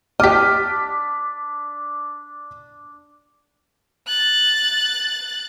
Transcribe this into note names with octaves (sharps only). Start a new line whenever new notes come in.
D4 G4 D#5 D6 F6 B6
F#6 A6